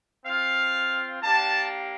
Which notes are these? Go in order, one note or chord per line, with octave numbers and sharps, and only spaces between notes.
C4 F4 F5
A#3 D4 G4 A5